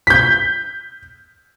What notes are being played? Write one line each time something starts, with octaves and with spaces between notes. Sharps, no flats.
G6 B6